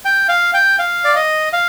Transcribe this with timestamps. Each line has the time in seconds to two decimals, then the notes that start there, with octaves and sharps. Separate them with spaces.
0.05 G5
0.29 F5
0.54 G5
0.79 F5
1.05 D5
1.15 D#5
1.53 F5